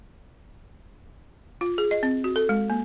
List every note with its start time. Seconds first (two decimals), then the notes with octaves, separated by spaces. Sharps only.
1.61 F4
1.78 G#4
1.91 D#5
2.03 C4
2.24 F#4
2.36 A4
2.49 G#3
2.70 A#3